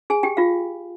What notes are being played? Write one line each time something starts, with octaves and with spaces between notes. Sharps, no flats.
G#4 G#5
G4 G5
F4 F5